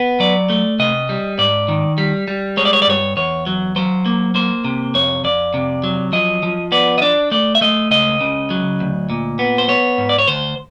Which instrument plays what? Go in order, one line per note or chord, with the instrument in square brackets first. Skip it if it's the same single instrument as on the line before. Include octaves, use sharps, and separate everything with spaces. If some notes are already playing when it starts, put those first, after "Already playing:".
Already playing: [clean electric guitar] B3
F#3 D5
A3
C3 D#5
G3
G#2 D5
D#3
G3
G3
G#3 C#5
D5
C#5
D5
G2 C#5
E2 C#5
F#3
F#3 C5
A#3
A#3 C5
C3
F2 C#5
F2 D5
C3
F#3
F3 D#5
F3
B3 D5
D#5
D4 D5
A3 D5
E5
A3 D#5
C#2 D#5
C#3
F#3
D2
A#2
B3
C5
B3 C#5
G#2
D5
C#5
D2 C5